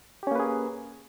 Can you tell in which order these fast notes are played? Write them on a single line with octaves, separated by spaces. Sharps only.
G4 C#4 A#3 B4 G#4